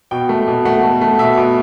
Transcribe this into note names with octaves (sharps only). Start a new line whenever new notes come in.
B2 G5
A3
B2
A3 F#5
A3
A3
B2 E5
B2